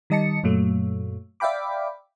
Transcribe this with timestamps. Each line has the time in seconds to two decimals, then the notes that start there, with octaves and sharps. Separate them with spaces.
0.10 D#3 G3 D#5 A5 C#7
0.43 F#2 A#2 F#3 A3
1.40 D5 E5 F5 G5 B5 D6